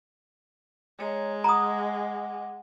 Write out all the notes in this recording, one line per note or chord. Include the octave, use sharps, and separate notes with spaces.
G#3 G#4 C#5 A#5
F#5 A#5 D6 D#6